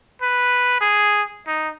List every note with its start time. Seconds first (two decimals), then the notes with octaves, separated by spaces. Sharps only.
0.22 B4
0.80 G#4
1.47 D#4